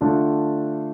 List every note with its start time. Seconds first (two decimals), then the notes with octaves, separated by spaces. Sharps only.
0.01 D3 A3 D4 F4